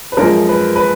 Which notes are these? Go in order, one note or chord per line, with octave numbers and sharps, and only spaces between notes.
B4
F#2 F3 G#3 A#4
B4
B4